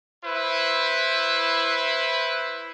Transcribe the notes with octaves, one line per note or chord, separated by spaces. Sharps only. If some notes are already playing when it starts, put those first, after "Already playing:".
E4 B4 C5